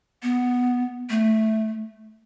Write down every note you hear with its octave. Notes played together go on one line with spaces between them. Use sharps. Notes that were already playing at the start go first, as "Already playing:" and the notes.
B3
A3